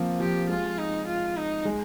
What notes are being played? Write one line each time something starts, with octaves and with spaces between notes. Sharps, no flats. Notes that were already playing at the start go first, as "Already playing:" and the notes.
Already playing: F3 A#3 C4
F3 G4
G#3 F4
D#4
F4
D#4
G#3